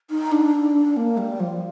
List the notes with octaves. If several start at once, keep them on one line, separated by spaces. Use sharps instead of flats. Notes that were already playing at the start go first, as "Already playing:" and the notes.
D#4
D4
A#3
G3
F3